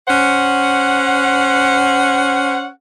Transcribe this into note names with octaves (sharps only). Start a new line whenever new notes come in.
C#4 C5 F#5